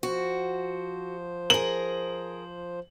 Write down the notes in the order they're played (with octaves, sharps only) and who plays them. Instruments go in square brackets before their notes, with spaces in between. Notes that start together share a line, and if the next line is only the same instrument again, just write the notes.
[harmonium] F3 C5 [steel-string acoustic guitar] F#4
[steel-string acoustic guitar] G#4 A#4 [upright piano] F#7